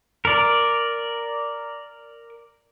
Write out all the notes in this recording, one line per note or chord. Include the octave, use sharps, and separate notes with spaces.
A#4 D5